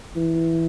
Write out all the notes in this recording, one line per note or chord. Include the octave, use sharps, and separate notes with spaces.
E3